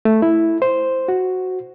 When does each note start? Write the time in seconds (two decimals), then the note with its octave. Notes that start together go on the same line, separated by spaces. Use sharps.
0.05 A3
0.22 E4
0.62 C5
1.08 F#4